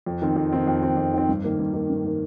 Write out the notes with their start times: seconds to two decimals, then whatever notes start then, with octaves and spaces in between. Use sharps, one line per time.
0.06 F2
0.22 D#3 C4
0.36 F2
0.52 D#3 C4
0.67 F2
0.83 D#3 C4
0.97 F2
1.14 D#3 C4
1.29 G2
1.44 D#3 A#3
1.59 G2
1.74 D#3 A#3
1.90 G2
2.05 D#3 A#3